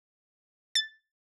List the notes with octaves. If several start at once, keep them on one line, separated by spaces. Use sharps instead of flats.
A6